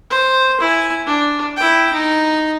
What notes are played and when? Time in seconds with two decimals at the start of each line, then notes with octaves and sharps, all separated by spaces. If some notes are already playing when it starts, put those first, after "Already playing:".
0.10 C5
0.60 E4 G#5
1.06 D4
1.56 E4 G5
1.93 D#4